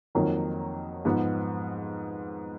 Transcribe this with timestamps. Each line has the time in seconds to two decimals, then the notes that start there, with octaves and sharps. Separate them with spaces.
0.15 F2 D#3 F#3 A#3
1.05 G#2 F3 B3